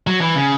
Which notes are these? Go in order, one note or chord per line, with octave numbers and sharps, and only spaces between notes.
F#3
E3
C#3